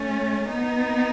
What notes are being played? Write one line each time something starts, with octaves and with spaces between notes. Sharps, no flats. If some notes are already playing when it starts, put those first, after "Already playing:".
Already playing: A3 C#4
B3 D#4